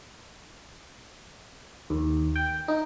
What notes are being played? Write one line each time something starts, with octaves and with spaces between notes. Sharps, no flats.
D#2
G5
D#4